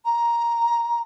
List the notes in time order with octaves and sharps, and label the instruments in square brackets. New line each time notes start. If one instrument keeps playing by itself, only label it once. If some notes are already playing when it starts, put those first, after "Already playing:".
[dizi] A#5